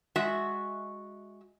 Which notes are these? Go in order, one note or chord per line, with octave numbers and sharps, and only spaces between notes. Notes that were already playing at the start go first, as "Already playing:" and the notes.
G#3 F#4 E5